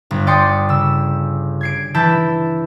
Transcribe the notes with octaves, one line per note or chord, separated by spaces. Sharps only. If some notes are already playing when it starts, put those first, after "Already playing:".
G1
D5 G5 C6 D#6 C#7
C#3 E6
G#6 C7 D7
E3 E4 E5 A5 G6